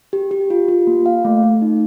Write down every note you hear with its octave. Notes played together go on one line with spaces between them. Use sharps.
G4
G4
F4
F4
A#3
F5
A3
A3
D#4